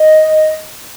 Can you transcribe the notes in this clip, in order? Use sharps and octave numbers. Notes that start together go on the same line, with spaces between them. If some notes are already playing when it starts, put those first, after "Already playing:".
Already playing: D#5